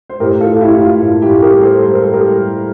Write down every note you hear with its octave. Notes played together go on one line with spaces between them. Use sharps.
C5
A2 G4 A#4
F4 A4
A2
F4
E4 G4
A2
F4
A2 F4
E4 G4
A2
G4 A#4
G3
A4 C5
G3 C5
A#4
A4
G3 G4 A#4
G3